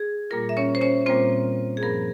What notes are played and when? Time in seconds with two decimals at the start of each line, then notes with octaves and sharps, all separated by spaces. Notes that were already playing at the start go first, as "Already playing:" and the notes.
Already playing: G#4
0.30 A#2 G3 A#3 F4 A#4
0.49 E5
0.57 C#4 C#5
0.75 C5
0.81 C#4 C#5
1.06 A#2 G3 A#3 C4 F4 C5
1.77 G#4
1.82 G2 F3 A#3 A#4